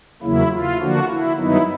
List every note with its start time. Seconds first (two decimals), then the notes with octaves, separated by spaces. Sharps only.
0.22 E2 C#3 F#3 A#3 E4
0.51 F4
0.79 D3 F3 A#3 D4 F#4
1.08 E4
1.37 G2 D#3 F#3 B3 D#4 E4